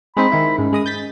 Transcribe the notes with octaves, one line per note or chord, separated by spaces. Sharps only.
G#3 C4 D#4 B5
D#3 E4
G#2 C#4
G#3 D#5 D#6
G6 A6 B6